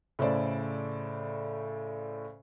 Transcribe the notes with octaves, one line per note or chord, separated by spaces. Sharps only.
A2 C#3 A4 C5 D5